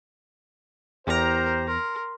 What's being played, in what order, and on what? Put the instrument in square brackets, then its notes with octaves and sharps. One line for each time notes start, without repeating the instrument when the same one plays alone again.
[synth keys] E2 A#5 [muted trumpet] G4 [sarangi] A#4 [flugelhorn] C5
[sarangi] A#4 [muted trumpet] C6